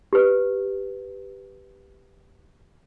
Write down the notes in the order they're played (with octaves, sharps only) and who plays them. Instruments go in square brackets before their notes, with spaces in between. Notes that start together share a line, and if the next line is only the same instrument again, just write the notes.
[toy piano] G4 B4